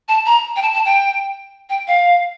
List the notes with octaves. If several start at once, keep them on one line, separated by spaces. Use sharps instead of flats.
A5
A#5
G5
A5
A5
G5
G5
F5